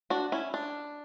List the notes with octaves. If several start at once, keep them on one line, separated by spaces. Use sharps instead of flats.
D4 F#4
C#4 E4
D4